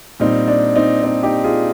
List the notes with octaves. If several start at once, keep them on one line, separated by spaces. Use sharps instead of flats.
A#2 G3 C4 D#4
D4
C4 D#4
C4 D#4
D#4 G4
F4 G#4